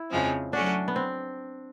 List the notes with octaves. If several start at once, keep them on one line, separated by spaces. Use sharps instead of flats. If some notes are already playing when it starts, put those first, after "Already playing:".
Already playing: E4
F2 C#3 F3 G#3 C4
F#3 A3 C#4 D4 F#4
B3
C4